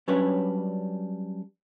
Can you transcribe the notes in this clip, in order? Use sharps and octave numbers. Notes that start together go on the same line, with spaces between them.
F#3 G3 C#4 D4 B4 C#5